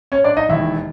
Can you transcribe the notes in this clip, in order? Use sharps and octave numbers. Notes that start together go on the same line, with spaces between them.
C#4 C#5
D4 D5
D#4 D#5
E1 D#2 D#3 E4 E5